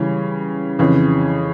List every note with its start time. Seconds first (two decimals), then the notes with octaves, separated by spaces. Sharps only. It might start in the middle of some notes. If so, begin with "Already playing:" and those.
Already playing: C#3 E3 G3
0.79 F2 C#3 E3